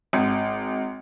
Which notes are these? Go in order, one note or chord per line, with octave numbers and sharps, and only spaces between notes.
G#1